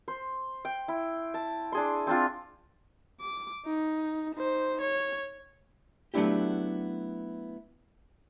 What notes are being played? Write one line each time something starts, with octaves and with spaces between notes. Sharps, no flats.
C5
G5
E4
A5
D4 G#4 C6
C4 D4 F4
D6
D#4
D#4 C5
C#5
F#3 A3 B3 D4 E4 G4